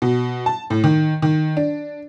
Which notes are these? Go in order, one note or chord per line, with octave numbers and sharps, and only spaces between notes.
B2
A5
A2
D#3
D#3
D4